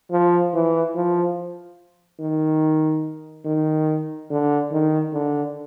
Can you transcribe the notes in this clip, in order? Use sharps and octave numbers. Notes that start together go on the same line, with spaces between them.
F3
E3
F3
D#3
D#3
D3
D#3
D3